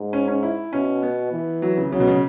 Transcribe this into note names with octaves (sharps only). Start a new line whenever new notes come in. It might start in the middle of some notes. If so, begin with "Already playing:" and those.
Already playing: G#2
C#4
C#4
E4
B2 C#4
B3
E3
F#3
C#3
C#3 F#3
B2
C#3